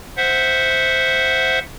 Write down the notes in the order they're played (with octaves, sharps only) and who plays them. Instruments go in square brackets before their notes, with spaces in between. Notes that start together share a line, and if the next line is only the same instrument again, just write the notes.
[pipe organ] C5 E5 F#5